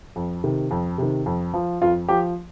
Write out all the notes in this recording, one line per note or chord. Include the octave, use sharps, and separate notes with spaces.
F2
C3 D#3
F2
C3 D#3
F2
F3
F2 F4
F3 G4